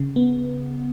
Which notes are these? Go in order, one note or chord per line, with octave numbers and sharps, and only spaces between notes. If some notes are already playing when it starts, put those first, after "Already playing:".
Already playing: C#3
B3